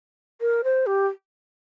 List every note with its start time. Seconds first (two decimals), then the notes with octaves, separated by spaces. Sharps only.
0.41 A#4
0.64 C5
0.86 G4